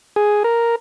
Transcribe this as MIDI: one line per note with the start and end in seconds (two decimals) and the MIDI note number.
0.16 0.43 68
0.44 0.76 70